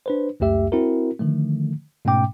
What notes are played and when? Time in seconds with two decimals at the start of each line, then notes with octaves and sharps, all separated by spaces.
0.06 D4 B4 C5
0.40 C#2 F#2 A3 G4 E5
0.72 C4 E4 F#4 A#4
1.19 D3 D#3 F3 A3
2.05 G#2 B2 A3 C#4 G5 D6